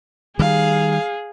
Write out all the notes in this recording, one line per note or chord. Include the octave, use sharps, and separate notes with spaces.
D#3 G3 G#4 F5